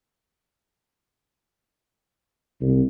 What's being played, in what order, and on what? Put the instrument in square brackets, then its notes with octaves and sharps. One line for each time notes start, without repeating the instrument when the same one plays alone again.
[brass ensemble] C2